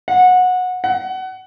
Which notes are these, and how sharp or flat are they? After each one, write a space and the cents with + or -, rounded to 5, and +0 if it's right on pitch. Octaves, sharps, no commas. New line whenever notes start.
F#5 -20
F#5 +25